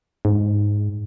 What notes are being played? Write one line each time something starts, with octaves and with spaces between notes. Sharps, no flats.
G#2